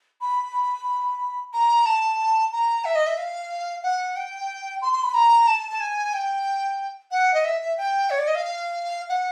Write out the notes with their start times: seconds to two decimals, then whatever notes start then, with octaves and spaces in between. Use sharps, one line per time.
0.21 B5
1.53 A#5
1.85 A5
2.52 A#5
2.84 E5
2.95 D#5
3.06 E5
3.17 F5
3.83 F#5
4.16 G5
4.81 C6
4.92 C6
5.03 B5
5.14 A#5
5.47 A5
5.69 A5
5.80 G#5
6.13 G5
7.11 F#5
7.33 D#5
7.44 E5
7.60 E5
7.77 G5
8.10 C#5
8.18 D5
8.27 D#5
8.35 F5
9.09 F#5